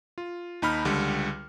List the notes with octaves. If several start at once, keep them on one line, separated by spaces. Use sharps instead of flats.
F4
D#2 D#4 B5 F6
C#2 D3 G3